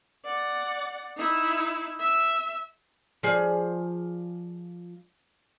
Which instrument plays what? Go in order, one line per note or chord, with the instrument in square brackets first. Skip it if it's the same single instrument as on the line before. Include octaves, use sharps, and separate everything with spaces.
[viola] D5 F#5
D#4 E4
E5
[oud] F3 G#4 D5